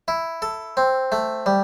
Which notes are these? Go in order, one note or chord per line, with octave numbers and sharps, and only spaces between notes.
E4
A4
C4
A3
G3